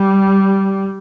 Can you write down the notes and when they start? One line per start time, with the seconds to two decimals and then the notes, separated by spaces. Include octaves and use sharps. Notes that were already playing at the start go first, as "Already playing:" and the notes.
Already playing: G3